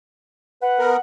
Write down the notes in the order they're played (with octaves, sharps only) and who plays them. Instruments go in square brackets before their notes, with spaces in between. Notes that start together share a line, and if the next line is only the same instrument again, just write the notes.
[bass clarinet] B4 [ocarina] F#5
[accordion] B3 A#4